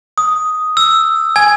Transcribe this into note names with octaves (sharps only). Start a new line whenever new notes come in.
D#6
E6
G#5 G#6